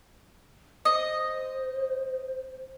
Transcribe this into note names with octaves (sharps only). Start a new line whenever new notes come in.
C5 D#5